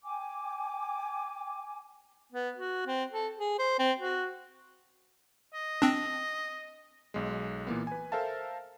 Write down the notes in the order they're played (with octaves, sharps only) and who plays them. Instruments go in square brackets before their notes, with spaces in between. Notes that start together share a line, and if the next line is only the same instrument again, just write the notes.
[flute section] G5 G#5 D6
[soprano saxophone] B3
F#4
C4
A4
G#4
C5
C4
F#4
[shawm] D#5
[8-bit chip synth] C4 D4
[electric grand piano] B1 G#3
A#2 E3 A#3 B3
B4 G#5
A4 A#4 C5 E5 F5 A5